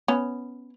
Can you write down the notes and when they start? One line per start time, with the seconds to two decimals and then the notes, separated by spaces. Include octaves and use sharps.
0.08 B3 C#4